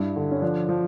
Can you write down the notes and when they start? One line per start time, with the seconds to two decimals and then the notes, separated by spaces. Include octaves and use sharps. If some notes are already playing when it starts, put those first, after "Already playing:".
Already playing: G2 E4
0.16 D3
0.31 C#4
0.42 F3 D4
0.69 F3